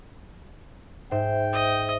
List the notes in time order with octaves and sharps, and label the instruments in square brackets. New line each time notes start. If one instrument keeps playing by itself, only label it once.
[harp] G#2 C6 [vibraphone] C5 E5 [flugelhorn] G5
[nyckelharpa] D#5